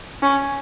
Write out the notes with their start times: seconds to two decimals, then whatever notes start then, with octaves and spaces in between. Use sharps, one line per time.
0.22 C#4